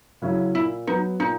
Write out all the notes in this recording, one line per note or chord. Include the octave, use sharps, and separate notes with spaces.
C#3 F#3 C#4 E4
A#2 E4
F#3 B3 D#4
A#2 D#4